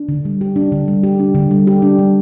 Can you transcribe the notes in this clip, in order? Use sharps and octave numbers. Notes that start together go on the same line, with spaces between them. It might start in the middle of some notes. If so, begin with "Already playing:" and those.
Already playing: D4
D3
G3
G4
D4
D3
G3
G4
D4
D3
G3
G4
D4
G3